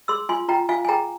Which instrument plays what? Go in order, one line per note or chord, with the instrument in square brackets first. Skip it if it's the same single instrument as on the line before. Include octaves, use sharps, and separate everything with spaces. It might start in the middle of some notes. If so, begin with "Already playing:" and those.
[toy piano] G#4 C6 E6
F4 G#5 C6
F4 G5 A#5
F4 F5 G#5
G#5
G#4 G5 A#5